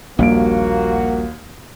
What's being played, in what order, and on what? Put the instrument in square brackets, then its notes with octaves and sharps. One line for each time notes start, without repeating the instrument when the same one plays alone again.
[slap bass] A#1 G3 [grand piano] D#2 D7 [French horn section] A#3 F#4